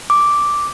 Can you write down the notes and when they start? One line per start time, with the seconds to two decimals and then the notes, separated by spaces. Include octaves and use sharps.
0.10 D6